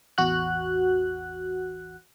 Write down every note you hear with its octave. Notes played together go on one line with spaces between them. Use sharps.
A1 E2 F#4 F#6